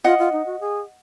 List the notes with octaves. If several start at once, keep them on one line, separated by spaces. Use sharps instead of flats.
F4 D#5 F#5
F4
D#4
F#4
G#4